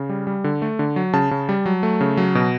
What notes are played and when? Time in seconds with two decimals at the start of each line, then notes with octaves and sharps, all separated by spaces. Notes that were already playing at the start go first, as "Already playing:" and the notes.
Already playing: C#3
0.09 G3
0.27 G3
0.44 D3
0.62 A3
0.79 D3
0.96 F#3
1.13 C#3 A5
1.31 C#3
1.49 G3
1.66 F#3
1.83 A3
2.01 C#3
2.17 F#3
2.35 B2